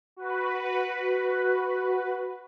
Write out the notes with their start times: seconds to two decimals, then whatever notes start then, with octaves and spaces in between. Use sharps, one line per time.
0.16 F#4 B4